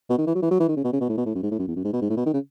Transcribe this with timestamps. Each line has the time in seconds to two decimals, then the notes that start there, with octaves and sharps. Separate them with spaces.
0.10 B2
0.18 D#3
0.27 E3
0.35 F#3
0.42 E3
0.51 F#3
0.60 E3
0.68 D#3
0.77 C#3
0.84 B2
0.93 C#3
1.01 B2
1.09 A2
1.17 B2
1.26 A2
1.35 F#2
1.43 G#2
1.51 A2
1.59 F#2
1.68 E2
1.76 F#2
1.85 G#2
1.93 B2
2.01 G#2
2.10 A2
2.17 B2
2.26 D#3
2.33 C#3